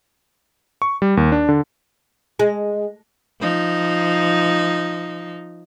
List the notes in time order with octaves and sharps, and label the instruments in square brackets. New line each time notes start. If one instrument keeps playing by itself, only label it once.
[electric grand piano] C#6
G3
D#2
D4
D3
[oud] G#3
[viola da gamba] F3 D#4